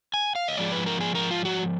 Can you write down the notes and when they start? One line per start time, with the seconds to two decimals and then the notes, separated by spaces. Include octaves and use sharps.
0.14 G#5
0.35 F5
0.48 D#5
0.57 G#2 F3 G#3 D5
0.72 B4
0.86 A#4
1.01 G#4
1.15 A#4
1.31 F4
1.45 F#4